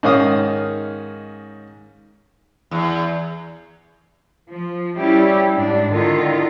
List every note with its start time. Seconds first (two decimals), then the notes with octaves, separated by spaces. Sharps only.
0.03 G#2 D#3 C#4 F5 D#6
2.71 E2
4.49 F3
4.96 G3 C#4 E4 G4
5.55 G#2 D4
5.91 D3 D#3 E4 F4